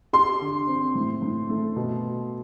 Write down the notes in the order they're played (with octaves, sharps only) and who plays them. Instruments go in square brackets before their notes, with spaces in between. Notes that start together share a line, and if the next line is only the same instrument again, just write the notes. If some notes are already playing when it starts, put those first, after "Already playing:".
[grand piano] G4 [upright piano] C6
[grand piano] D3
C4
A2
A2
A3
B2